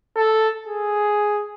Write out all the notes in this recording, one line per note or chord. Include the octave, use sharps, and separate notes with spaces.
A4
G#4